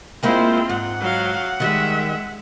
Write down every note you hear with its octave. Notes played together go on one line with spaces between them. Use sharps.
G#3 A#3 C4 E4 F4 G4 C5
G#2 F#5
F#3 F5
D#3 G3 G#3 E5